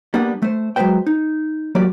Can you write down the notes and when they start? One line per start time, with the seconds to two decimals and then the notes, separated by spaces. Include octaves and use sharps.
0.14 G3 A#3 B3 D4 F#5
0.42 A3 C5
0.76 F#3 G#3 C4 B4 C5 G5
1.07 D#4
1.75 F#3 A3 A#3 G4 D5